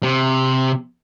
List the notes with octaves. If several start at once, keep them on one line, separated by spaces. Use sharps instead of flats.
C3